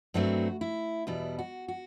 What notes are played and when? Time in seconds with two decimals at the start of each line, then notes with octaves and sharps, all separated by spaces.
0.14 G2 F#3 A3 C4 F#4
0.61 E4
1.07 E2 B2 G3 E4
1.39 F#4
1.68 F#4